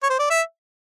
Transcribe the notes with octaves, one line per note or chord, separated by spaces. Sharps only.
C#5
C5
D5
E5